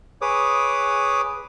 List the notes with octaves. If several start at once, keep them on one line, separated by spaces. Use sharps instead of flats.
G#4 B4 C#5 D6 D#6